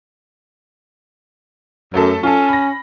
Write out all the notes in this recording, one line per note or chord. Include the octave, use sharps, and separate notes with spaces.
F#2 F#3 A3 A4
C#4 F4 A4
B5 A#6